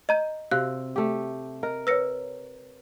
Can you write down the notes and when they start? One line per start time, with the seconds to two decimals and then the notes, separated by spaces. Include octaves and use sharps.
0.09 D#5 A#5 G6
0.51 C3 F#4 F5 F#6
0.96 A3 G4
1.63 A#4 D#5
1.87 B4 C#5 E6 A#6 C#7